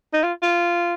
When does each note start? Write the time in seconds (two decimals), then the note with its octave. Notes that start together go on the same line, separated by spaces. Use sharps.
0.13 D#4
0.23 F4
0.42 F4